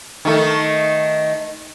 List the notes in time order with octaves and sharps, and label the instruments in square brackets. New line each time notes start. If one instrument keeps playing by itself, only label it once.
[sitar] D#3 A3